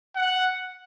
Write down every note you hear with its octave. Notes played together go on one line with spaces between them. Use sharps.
F#5